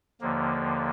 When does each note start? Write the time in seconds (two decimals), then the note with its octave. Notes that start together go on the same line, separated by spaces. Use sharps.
0.21 D#2 D3 F3 A#3